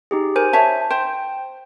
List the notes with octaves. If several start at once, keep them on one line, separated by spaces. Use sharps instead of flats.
D#4 G4 G#4
A#4 C5 G#5
C#5 E5 A5
C5 G5